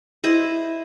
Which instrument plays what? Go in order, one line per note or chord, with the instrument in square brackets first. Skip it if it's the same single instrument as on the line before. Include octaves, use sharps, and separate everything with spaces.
[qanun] E4 C5 D#5